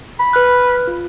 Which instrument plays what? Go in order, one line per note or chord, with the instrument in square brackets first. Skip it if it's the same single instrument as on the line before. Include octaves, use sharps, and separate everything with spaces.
[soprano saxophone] B5
[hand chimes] B4 F6 F#6
F4